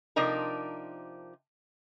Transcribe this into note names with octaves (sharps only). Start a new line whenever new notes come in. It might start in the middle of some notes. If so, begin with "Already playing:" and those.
C3 F3 D4 D#4 A#4